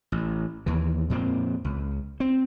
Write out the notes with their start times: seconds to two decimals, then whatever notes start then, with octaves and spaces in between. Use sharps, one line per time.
0.12 A1
0.66 D#2 E3
1.10 F2 A#2 G#3 C4
1.65 C#2
2.20 C4